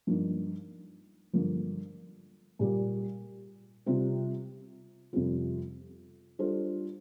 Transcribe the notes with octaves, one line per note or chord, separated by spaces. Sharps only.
G2 F3 A#3 D#4
G2 D3 F3 A#3
A#2 G3 A#3
C3 G3 C4 F4
F2 C3 G3 C4 F4
G3 D4 F4 A4 C5